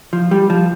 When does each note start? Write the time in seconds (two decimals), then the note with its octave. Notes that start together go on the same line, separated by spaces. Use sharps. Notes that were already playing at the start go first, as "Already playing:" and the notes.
0.13 F3
0.31 G3
0.50 F3